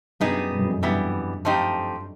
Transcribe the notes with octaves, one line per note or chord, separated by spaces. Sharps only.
F#2 G3 B3 D#4 G#4
G2
F#2
F2
F#2
G2 E3 G3 B3
F3 A3 C4 D#4 G4